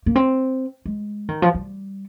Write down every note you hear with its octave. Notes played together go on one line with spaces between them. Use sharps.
A#3
C4
G#3
D#3
F3
G3